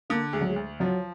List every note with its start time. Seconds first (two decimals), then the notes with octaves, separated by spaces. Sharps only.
0.10 D3 A#3
0.33 D2 G#3
0.41 F#3
0.49 G#3
0.56 D2
0.80 F3 F#3